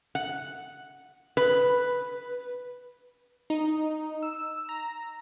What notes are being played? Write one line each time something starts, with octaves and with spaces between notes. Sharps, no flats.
F#5
B4
D#4
E6
A#5